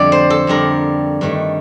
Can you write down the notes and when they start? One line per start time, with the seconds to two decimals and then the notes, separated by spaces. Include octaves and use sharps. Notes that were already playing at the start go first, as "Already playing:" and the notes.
Already playing: F2 D3 G3 D5
0.12 C5
0.30 A4
0.47 F2 D3 G3 A#4
1.21 G2 D#3 A3